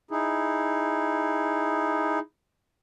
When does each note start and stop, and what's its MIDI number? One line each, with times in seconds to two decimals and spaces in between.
0.11 2.19 63
0.11 2.19 64
0.11 2.19 68